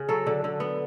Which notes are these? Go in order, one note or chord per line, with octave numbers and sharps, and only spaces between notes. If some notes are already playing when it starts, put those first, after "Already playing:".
Already playing: C#3
F#3 A4
D3
D3
B3